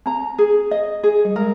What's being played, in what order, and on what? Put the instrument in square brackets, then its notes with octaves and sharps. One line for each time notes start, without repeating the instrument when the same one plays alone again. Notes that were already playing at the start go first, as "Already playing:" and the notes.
[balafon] C4 [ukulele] A#5
[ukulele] G#4
D#5
G#4
[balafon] G3
[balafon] G#3 [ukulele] A#4